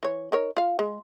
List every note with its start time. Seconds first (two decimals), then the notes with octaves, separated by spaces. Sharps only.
0.03 E3 C#5
0.32 D#4 A#4 C#5
0.57 F4 F5
0.79 G#3